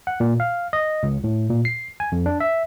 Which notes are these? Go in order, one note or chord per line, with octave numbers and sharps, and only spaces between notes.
F#5
A#2
F5
D#5
C#2
A2
A#2
C7
G#5
F2
D4
E5